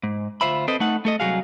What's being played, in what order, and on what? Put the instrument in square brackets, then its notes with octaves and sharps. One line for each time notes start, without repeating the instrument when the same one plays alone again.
[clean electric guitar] G#2
D2 F4 C5 E5 B5
C4 A4 B4 C5 D#5
A3 D#4 F#5
A3 A4 D#5
C2 C#3 F#3 F#4 G#4 F5